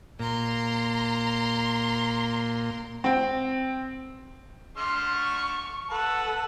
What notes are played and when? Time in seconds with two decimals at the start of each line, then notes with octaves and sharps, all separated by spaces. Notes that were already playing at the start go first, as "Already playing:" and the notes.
0.20 A#2 A#5 C6
3.04 C4 G5
4.77 D3 A3 C6 F6
5.14 C#6
5.91 A4 B4 F#5